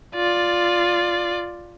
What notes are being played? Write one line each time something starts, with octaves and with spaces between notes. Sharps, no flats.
F4 D5